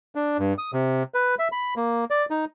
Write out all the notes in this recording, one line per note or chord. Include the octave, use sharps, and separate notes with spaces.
D4
G2
D#6
C3
B4
E5
B5
A#3
D5
D#4